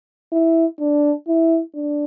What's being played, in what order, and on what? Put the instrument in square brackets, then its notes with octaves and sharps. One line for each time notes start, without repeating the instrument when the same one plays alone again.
[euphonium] E4
D4
E4
D4